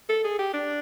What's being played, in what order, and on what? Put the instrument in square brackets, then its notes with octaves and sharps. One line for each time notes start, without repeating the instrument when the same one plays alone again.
[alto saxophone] A4
G#4
G4
D4